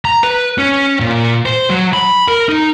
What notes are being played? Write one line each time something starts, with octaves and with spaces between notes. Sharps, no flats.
A#5
B4
C#4
A#2
C5
F#3
B5
A#4
D#4